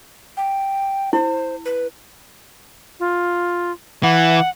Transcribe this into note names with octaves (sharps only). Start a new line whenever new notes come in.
G5
E4 C5
B4
F4
E3 F#5